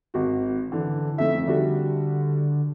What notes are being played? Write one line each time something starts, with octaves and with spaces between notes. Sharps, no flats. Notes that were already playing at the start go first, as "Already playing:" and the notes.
G#1 F#4
D3 E3
F2 A3 D#4 E5
D3 G3 F#4 A4